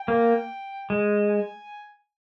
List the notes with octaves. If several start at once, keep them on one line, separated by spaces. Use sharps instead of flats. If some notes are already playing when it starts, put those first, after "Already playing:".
Already playing: G5
A#3
G#3
G#5